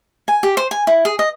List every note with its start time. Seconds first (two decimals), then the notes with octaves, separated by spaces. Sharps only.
0.28 G#5
0.43 G4
0.57 C5
0.71 G#5
0.87 E4
1.05 G#4
1.19 D#5